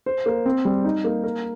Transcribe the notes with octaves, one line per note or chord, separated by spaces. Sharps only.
C5
A#3
C4
G3
D#4
A#3
A#4